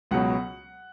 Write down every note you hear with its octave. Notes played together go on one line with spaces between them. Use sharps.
C#2 B2 F#3 F#5